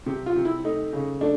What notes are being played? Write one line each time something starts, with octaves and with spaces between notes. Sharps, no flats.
C3 G4
F4
C3
E4
A3 D#4
C#3
A3 D4